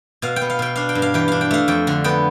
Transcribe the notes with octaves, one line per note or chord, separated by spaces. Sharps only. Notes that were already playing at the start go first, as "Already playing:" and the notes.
B2 F5
G5
B3
F5
B2 G5
D4 F5
G5
G2
F5
E3 G5
D4 F5
G5
A3 F5
F2 G5
D3
B3 G5